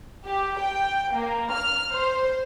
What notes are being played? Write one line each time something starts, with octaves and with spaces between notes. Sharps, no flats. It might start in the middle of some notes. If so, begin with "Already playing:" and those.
G4
G5
A#3
F6
C5